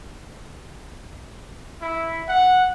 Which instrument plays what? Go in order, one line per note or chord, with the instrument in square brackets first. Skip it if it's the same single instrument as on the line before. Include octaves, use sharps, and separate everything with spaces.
[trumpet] E4
F#5